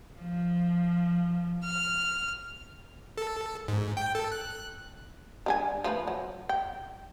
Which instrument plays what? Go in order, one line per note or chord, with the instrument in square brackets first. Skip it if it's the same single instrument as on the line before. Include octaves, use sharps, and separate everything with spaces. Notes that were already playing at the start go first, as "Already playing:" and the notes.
[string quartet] F3
F6
[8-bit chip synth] A4
G#2
G5
A4
F#6
[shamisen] G3 D4 G#5
F3 A3 B4
F#3
G5